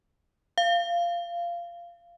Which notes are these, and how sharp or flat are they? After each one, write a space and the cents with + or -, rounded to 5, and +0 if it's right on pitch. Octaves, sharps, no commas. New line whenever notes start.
F5 -15